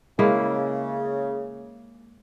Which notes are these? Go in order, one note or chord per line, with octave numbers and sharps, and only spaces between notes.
C#3 G#3 A#3 E4